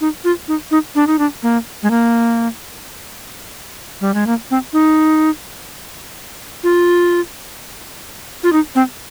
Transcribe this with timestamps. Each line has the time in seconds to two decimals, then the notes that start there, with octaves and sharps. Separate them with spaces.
0.01 D#4
0.24 F4
0.48 D#4
0.71 D#4
0.95 D4
1.07 D#4
1.19 D4
1.43 A#3
1.83 G#3
1.91 A#3
4.01 G3
4.14 G#3
4.27 A#3
4.51 C4
4.73 D#4
6.63 F4
8.43 F4
8.53 D#4
8.75 C4